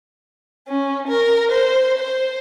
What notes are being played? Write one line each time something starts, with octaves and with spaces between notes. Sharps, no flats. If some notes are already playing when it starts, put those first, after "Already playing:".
C#4
A#4
C5
C5